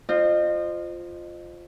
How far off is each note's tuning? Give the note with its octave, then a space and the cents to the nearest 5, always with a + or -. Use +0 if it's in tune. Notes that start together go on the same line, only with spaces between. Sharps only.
F4 +0 C5 +0 D#5 -30